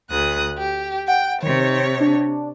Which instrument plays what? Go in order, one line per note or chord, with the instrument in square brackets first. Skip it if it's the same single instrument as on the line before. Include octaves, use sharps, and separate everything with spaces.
[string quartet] D2 D#6 F#6
G4
[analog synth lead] F#5 [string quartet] G5
[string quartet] C3 C#5 [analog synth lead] D#3
[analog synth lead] D4